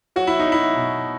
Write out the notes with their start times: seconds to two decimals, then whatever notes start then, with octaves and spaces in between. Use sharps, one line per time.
0.16 F#3 F#4
0.27 E4
0.40 D#4
0.46 F#3
0.52 E4
0.76 B2